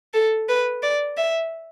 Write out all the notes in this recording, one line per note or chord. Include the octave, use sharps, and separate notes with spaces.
A4
B4
D5
E5